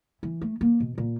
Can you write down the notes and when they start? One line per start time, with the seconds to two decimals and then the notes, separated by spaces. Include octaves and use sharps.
0.23 E3
0.41 A3
0.61 A#3
0.80 B2
0.98 A#2